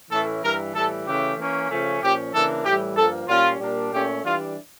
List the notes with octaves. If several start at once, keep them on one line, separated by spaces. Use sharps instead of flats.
A2 E3 A3 C#4 A4
G2 E3 G3 A#4
A2 E3 G3 A4
C#3 E3 A3 C#4 G4
E3 A#3 C#4
C#3 F3 A3 C#4
A#2 F3 C#4 G4
C#3 E3 A#3 D4 A4
A2 E3 G3 G4
G2 F3 A#3 A4
A#2 G3 C#4 F4
A#2 G3 A#3 D4
A#2 A3 C#4 G4
E3 G3 D4 F4